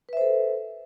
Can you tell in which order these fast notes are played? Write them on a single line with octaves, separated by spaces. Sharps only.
B4 E5 C5 A4